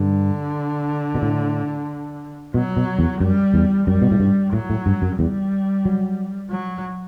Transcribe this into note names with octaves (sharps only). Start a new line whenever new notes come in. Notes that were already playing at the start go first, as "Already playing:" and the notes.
Already playing: G2 D3
B2
A2
B2 F#3
B2
E2
F#2 G3
E2
F#2 G3
B2
A2
G2
A2 F#3
A2
G2
F#2
E2 G3
F#3
F#3